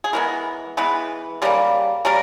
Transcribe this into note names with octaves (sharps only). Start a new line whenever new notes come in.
G#4
E3 G#3 B3 A#4
E3 G#3 B3 B4
C#3 G3 A#3
C#3 G3 A#3 A#4